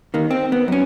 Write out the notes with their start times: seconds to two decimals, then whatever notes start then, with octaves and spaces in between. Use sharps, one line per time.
0.14 D#3 A#3
0.30 C4
0.52 B3
0.68 F#2 C#4